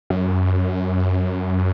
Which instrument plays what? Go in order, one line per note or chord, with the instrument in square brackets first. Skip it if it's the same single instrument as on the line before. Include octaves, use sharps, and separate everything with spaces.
[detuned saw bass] F#2